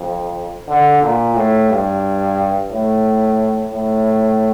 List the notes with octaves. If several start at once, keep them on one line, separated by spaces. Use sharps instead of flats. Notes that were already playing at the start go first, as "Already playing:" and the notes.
Already playing: F2
D3
A#2
A2
G2
A2
A2